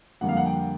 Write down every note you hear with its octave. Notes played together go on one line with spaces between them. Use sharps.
F2 D3 G3 A#3 F#5
F5
F#5
G5